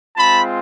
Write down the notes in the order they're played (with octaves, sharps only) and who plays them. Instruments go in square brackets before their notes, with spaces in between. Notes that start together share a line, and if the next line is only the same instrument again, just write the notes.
[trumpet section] G#3 C4 F4 A5 B5